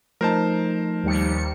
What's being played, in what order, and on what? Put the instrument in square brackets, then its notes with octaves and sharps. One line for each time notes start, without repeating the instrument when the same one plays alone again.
[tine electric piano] F3 D#4 [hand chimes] A3 [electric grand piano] A#4 C5 A5
[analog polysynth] D#2 G3 C#7